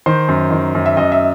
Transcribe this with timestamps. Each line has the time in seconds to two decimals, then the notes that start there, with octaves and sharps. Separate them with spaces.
0.06 D#3 C5
0.28 F#2
0.51 D#3
0.75 F#2
0.86 E5
0.97 F#2 D#5
1.12 E5